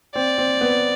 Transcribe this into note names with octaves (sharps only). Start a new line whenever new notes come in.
C4 D5
C4
B3